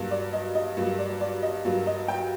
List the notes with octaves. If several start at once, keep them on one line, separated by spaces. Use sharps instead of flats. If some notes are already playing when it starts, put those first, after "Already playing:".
Already playing: G2 F#3 A#3
D5
D#5
D#5
G2 F#3 A#3
D5
D5
D#5
G2 F#3 A#3
D#5
G5